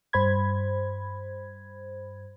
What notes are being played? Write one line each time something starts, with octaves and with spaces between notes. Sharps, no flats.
G2 C5 B5 G#6